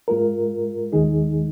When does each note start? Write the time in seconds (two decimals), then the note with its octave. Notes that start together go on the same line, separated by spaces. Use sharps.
0.08 G#2 G#3 F4 A#4
0.92 D#2 D#3 G#3 D#4 G#4